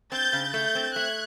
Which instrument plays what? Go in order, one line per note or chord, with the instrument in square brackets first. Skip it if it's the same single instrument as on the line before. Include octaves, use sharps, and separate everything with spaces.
[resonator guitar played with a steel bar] C4 [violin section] G6 A6
[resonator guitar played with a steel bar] C#3
[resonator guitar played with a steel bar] A3 [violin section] G6 A6
[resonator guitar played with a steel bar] C4
[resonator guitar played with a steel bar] A3 [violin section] F#6 G#6